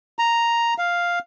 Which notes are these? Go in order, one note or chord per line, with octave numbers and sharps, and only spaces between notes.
A#5
F5